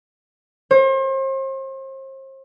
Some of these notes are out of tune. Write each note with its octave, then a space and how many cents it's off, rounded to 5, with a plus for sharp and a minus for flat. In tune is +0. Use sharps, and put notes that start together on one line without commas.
C5 +40